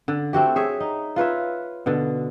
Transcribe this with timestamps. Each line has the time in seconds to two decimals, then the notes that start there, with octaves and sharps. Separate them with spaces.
0.08 D3
0.33 A3 C4 F#4 G4
0.56 G#4 C#5 E5
0.80 D#4
1.16 F4 B4 C#5 E5
1.86 B2 D3